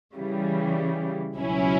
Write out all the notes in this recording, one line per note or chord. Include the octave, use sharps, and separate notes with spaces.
C#3 E3 G3
C#2 B2 F#3 C#4 E4